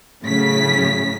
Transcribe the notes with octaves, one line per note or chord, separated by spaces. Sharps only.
A2 C#3 F#3 B6